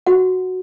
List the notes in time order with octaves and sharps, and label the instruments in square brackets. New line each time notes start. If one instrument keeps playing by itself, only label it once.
[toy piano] F#4 F#5